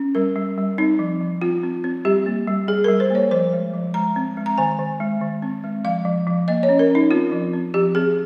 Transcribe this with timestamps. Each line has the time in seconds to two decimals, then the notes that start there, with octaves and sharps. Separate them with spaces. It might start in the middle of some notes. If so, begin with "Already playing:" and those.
Already playing: C#4
0.15 G3 A#4
0.36 G3
0.58 G3
0.78 C4 D#4
0.99 F3
1.21 F3
1.42 C4 F4
1.63 C4
1.84 C4
2.05 G3 G4
2.26 A#3
2.47 G3
2.68 G3 G#4
2.84 A#4
2.89 G3
3.00 C5
3.10 A#3 C#5
3.31 F3 C5
3.53 G#3
3.74 F3
3.94 G#3 A#5
4.16 C4
4.37 G#3
4.46 A#5
4.58 D#3 G#5
4.79 D#3
5.00 G#3
5.21 D#3
5.42 C4
5.64 G#3
5.84 F3 F5
6.05 F3
6.27 F3
6.48 A#3 D#5
6.63 C#5
6.69 C#4
6.79 A#4
6.90 C#4 D#4
7.11 C4 F4
7.32 F3
7.53 C4
7.74 F3 G4
7.95 C4 G#4